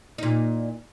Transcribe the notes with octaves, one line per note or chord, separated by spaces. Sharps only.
A#2 D#4